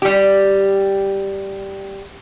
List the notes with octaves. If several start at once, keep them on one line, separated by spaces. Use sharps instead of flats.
G3 G4